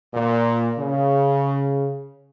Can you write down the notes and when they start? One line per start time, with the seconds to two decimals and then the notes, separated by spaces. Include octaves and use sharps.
0.13 A#2
0.77 C#3